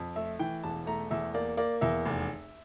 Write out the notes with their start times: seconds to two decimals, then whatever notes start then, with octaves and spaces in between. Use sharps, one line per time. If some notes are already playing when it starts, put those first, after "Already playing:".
Already playing: F2
0.16 A3 E5
0.39 E3 G5
0.63 E1 A5
0.86 A3 A#5
1.11 E2 E5
1.34 A#3 D5
1.57 A#3 D5
1.81 E2 E5
2.05 F1